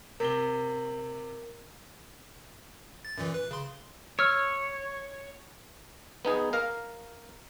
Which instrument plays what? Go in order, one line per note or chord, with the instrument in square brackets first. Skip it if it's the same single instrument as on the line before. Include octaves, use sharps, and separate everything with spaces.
[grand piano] C3 G7 [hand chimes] A#4
[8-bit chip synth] A6
F#2 A#2 E3
B4
C#3 C6
[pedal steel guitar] C#5 [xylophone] E6 F6
[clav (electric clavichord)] B3 D#4 G#4
A#4 F5